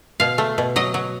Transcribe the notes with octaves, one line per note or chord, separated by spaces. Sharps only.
B2 F5
A3
B2
F#3 D#5
F#3